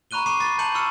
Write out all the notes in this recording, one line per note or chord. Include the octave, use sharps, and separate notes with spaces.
A#5 B5 C#6 F#6 D#7 G7
A#5 C#6 D6 C7 D#7
B5 D6 A6 C7
A5 A#5 G6 C#7 D#7 F#7
B5 C#6 E6 F6 C#7 E7